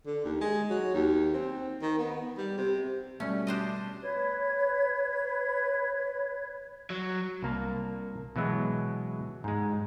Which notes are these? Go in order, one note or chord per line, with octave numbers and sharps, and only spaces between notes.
D3
D#2
G#3
F#3
D#2
C4
D#3
B3
G3
C3
B2 G3 A3 C#4
D4 C5 D#5
B4 C#5 G#6
F#3
C2 A#3 A5
B2 E3 F#3 G#3
G#2 G#3